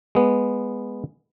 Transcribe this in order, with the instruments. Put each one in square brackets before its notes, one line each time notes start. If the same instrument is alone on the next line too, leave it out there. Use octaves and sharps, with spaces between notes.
[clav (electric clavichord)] G#3 B3